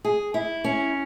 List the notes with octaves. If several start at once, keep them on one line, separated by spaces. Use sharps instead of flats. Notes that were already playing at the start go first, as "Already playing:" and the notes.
G#4
E4
C#4